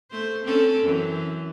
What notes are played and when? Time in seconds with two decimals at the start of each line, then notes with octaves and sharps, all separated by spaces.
0.11 A3 C5
0.45 C4 C#4 A4
0.83 F#2 E3